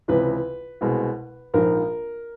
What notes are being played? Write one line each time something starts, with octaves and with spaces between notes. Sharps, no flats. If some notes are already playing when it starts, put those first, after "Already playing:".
C#2 C3 E3 B4
C2 B2 G#3
A#1 G#2 F3 A#4